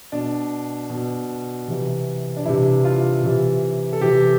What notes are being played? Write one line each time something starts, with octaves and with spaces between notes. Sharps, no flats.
B2 D4
B2
C3 E3
D4
C3 E3 E4
F4
C3 E3
A4
C3 E3 G4